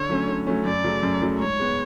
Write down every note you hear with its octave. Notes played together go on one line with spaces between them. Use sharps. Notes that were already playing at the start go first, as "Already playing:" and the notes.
Already playing: D3 C#5
F#3 A3 C#4
D3
F#3 A3 C#4
F#2 D5
C#3 F#3 A3
F#2
C#3 F#3 A3
G#2 C#5
G#3 B3